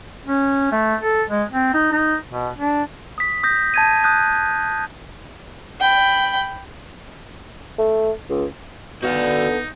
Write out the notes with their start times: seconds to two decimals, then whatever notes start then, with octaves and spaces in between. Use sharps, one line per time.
0.26 C#4
0.72 A3
1.01 A4
1.30 G#3
1.52 C4
1.74 D#4
1.92 D#4
2.30 B2
2.59 D4
3.18 D#6 B6
3.44 D#6 G6 A#6
3.74 A5 G#6 D#7
4.04 D#6 F#6 G6
5.81 G5 B5
7.78 A3
8.30 C#2
9.03 D3 B3 D#4 F#4 D5 F5